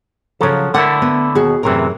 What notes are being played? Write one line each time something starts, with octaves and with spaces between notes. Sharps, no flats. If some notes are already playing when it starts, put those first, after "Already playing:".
C#3 F3 F#3 A4
D3 A3 E4 A#4 F#5
B3
D#2 B2 F#4 G#4
F#2 A2 C3 E3 G#4 A#4